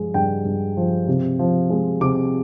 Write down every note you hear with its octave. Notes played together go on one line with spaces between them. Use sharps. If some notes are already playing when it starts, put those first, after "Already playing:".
Already playing: G2 F3 G#3
G2 G5
G2
F3
C3
F3
G#3
C3 D6